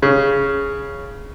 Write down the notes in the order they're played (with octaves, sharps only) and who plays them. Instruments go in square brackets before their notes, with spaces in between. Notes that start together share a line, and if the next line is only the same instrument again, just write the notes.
[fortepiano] C#3